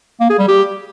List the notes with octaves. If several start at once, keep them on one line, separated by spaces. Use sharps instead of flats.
A#3
G#4
G3
G4